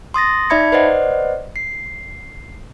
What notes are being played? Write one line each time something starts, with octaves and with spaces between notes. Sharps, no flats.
C6 D#6 A6 A#6
D#4 D5 E5 B5 G#6 C#7
B4 C5 D5 D#5 F#5
C7